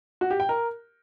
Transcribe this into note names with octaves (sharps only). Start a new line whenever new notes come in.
F#4
G4
G5
A#4